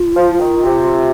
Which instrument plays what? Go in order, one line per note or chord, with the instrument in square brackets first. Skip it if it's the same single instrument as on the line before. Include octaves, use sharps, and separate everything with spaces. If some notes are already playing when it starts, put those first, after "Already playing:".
Already playing: [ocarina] F4
[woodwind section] F3
D#3
C3